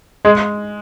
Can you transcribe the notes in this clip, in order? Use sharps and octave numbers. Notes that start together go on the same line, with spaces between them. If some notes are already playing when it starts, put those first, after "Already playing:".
G#3